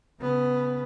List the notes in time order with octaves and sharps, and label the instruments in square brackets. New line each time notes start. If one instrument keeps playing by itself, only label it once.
[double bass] C#3 B3